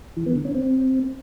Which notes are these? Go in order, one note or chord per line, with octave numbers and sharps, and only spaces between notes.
E3
B3
D3
C#4
C4